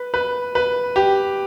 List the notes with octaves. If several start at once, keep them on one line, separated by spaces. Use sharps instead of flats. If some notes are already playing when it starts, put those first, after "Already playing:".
Already playing: B4
B4
B4
G4